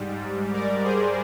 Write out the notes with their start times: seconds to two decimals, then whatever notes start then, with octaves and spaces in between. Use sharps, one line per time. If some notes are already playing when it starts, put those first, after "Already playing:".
Already playing: G#2 G3
0.53 A#4 D5
0.84 G#4 C5